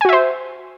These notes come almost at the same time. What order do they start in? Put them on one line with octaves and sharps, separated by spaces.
G#5 F#4 E5 C5